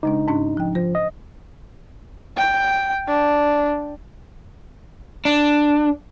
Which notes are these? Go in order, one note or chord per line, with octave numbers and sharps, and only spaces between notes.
C#3 G#3 D4 D#4
G#2 C#4 D4
F3 G5
F3 C5
D#5
G5
D4
D4